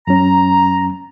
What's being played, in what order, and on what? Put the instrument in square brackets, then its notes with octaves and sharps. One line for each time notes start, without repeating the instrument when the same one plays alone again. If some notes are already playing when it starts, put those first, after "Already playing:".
[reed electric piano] F#2 F#3 C#4 [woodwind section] A#5